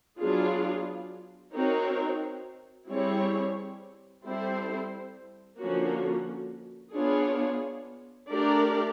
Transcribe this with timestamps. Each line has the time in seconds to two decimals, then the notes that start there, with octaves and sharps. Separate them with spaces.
0.18 F#3 B3 D4 F4 G#4
1.53 C4 D#4 F#4 A#4 C#5
2.89 G3 C4 E4 G#4 C#5
4.24 G3 C4 E4 A4 C5
5.59 D3 F3 A#3 C#4 F#4
6.94 B3 D4 F4 G#4 C#5
8.30 A3 D4 G4 A#4 D5